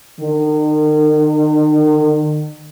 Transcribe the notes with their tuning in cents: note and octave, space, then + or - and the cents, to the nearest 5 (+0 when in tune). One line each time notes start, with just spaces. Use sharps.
D#3 -40